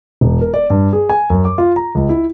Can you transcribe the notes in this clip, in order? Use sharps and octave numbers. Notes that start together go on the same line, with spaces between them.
E1
A#4
D5
G2
G#4
G#5
F#2
D6
F4
A#5
C#2
E4